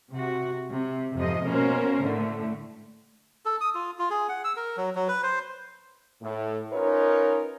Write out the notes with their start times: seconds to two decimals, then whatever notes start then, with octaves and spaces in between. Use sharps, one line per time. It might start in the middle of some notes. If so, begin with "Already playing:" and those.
0.12 C3 F#4
0.70 C3
1.16 F2 G#2 C3 F3 D#5
1.46 B2 A#3 C#4 A#4 C5
2.00 A2 D3 A3
3.45 A4
3.61 D#6
3.74 F4
3.99 F4
4.10 G#4
4.29 F#5
4.44 E6
4.56 A#4
4.77 F#3
4.95 F#3
5.08 B4
5.23 C5
6.22 A2
6.73 C#4 D#4 F4 A#4 B4 C#5